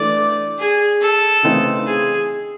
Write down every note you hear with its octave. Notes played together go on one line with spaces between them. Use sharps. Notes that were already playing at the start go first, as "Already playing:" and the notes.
Already playing: E3 A3 D4 D5
G#4
A4
C#3 E3 A3 C4 D#4
G#4